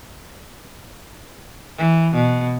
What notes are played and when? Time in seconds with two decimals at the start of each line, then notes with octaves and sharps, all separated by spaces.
1.78 E3
2.15 B2